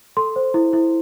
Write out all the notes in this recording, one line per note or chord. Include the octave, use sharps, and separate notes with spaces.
A4 C6
C5
E4
E4